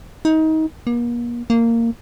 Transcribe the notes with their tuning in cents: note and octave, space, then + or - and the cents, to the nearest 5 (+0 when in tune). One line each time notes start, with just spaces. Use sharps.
D#4 +25
A#3 +40
A#3 -15